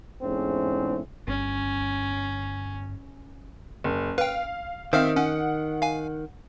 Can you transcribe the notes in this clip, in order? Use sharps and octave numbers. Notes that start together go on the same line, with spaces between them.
E2 G#2 A3 C4 C#4
G1 C#4
F#1
B4 F5 G5
D#3 C4 C5 E5 F5 F6
C#4 F#5
F5 G#5